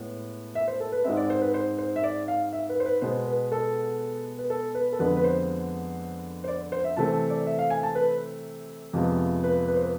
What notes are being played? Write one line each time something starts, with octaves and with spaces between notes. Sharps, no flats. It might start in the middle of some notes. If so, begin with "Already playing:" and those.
Already playing: A2 G#3 B3
E5
C5
A4
B4
G#2 G#3 C4 E5
D5
C5
B4
C5
C5
E5
D5
F5
E5
B4
C5
B4
B2 G#3 B3 C5
B4
A4
B4
A4
B4
A4
F2 D3 G#3 B3 B4
B4
C5
C5
D5
C5
E5
C3 E3 A3 C4 A5
A5
D5
E5
F5
G#5
A5
B4
F2 C3 F3 G#3 B3
B4
B4
C5
B4